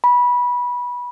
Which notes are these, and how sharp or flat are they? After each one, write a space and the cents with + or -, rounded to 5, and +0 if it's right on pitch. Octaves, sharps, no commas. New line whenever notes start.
B5 -20